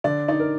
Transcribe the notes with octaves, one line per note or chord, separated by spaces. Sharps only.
D3 D5
D#4 D5
A#4